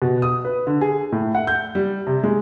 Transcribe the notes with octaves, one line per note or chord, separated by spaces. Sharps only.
B2
D#6
B4
D3
G#4
A2
F#5
G6
G3
C3
G#3